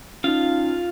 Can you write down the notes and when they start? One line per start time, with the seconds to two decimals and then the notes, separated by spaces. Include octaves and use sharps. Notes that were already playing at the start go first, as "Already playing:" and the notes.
0.24 C#4 D#4 F4 F5